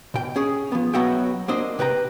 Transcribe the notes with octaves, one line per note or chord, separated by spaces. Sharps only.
B2 G5
C#4 G#4
F3 B3
B1 F#3 B3 F#4 E5 G5
A#3 C4 D4 C5 D#5
C3 B4 G5 A#5